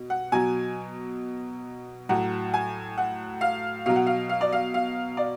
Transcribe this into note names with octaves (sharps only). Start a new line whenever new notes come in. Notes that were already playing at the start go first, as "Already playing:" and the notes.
Already playing: B2
F#5
B2 F#3 G#5
A2 F#3 F#5
G#5
F#5
F5
B2 F#3 F5
F#5
F5
F5
D5
F5
F5
D5